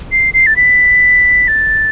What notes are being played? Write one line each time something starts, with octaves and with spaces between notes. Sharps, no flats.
C7
C7
A6
B6
A6